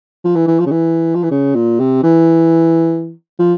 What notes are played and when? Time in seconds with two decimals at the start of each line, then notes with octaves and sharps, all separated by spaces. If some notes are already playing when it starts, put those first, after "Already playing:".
0.25 F3
0.35 E3
0.47 E3
0.60 F3
0.66 C#3
0.71 E3
1.15 F3
1.23 E3
1.31 C#3
1.55 A#2
1.79 C3
2.03 E3
3.39 F3